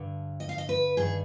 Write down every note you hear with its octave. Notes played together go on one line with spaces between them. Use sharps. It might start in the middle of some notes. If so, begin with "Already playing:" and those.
Already playing: G2 D3
D#5
F5
D#5
B4
G2 D#3 G#4